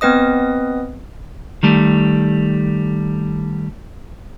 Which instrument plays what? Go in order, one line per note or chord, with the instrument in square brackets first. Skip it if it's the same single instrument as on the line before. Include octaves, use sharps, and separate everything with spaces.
[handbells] B3 C4 B4 D#5 D#6
[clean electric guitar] D#3 G3 A3